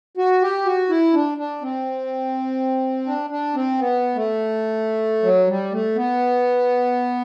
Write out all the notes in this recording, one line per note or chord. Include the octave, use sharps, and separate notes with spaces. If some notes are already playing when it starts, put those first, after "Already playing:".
F#4
G4
F#4
E4
D4
D4
C4
D4
D4
C4
B3
A3
F#3
G3
A3
B3